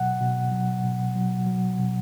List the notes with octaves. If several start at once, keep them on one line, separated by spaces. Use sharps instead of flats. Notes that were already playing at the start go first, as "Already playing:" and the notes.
Already playing: B2 F#3 F#5
B2
F#3
B2
F#3
F#3
B2